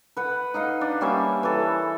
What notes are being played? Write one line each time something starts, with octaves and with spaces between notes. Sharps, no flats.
B4 F#5
D#4 D#5 F5 F#5
D4
G3 A#3 C#4 E5
E3 A4